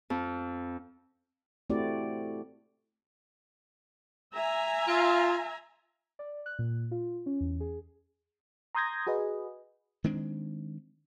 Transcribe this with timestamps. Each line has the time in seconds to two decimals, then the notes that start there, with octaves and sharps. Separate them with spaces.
0.10 F2
1.70 A3 C4 E4 F#4 G4 D5
4.33 E5 G#5 A#5
4.88 F4
6.19 D5
6.46 F#6
6.59 A#2
6.91 F4
7.26 C#4
7.41 E2
7.60 G#4
8.75 A#5 C6 D#6 G6 G#6 A#6
9.07 F#4 G#4 B4 D#5
10.04 D#3 G#3 C4 D4